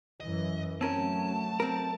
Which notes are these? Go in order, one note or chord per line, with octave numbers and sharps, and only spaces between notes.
F#2 E3 D#5
F#3 A3 C4 C#4 A#4 A5
C4 A#4